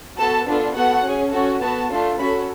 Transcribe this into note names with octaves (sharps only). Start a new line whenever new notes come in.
B3 F#4 A4 A5
B3 D4 F4 A4
B3 F#4 A4 F#5
C#4 G#4
C#4 F#4 A4
B3 F#4 A4 A5
A3 D4 F4 A4
C#4 F#4 A4 B5